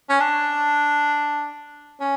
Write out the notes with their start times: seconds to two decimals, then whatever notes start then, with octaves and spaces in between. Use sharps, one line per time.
0.09 C#4
0.20 D4
2.01 C#4